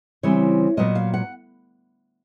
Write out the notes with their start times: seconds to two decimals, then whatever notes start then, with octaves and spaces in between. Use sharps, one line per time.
0.23 C#3 E3 G3 C4 C#5
0.77 A#2 F#3 B3 D#5
0.95 F5
1.14 F#5